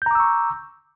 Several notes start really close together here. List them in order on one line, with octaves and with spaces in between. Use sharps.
G6 A#5 D6 E6 C#6